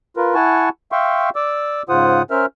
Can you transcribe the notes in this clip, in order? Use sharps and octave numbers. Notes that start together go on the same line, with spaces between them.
F4 A#4 B4
E4 F#5 G#5 A5 C#6
E5 F5 G5 C6 C#6
D5 D6 E6
G#2 C#3 F4 C5 F#5 D#6
C#4 A#4 C5 E5 F6